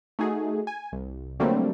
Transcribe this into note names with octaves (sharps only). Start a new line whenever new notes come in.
A3 D#4 F#4 G#4
G#5
C2
D3 F#3 G3 A3 A#3 C4